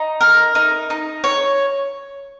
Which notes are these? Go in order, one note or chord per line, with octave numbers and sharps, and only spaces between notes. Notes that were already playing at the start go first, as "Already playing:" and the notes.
Already playing: D#4
A#4
D#4
D#4
C#5